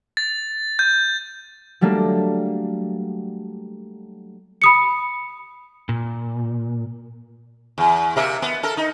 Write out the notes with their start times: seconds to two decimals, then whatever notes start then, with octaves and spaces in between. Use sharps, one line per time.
0.17 A6
0.79 G6
1.81 F#3 G3 A3 A#3 D4
4.62 B5 D#6 C#7
5.89 A#2
7.78 E2
8.16 C3 A#3 E5
8.42 B3
8.63 A4 A#4
8.77 D#4